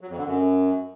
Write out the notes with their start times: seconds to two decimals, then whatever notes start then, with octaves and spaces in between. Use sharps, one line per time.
0.01 F#3
0.09 F2
0.18 D3
0.26 F#2